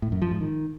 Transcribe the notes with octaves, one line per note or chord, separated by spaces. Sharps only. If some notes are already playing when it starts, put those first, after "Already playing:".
A2
F#2
F3
G#2
D#3